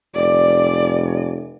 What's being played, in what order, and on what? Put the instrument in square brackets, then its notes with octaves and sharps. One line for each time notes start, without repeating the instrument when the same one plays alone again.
[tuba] F1 [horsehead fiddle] D5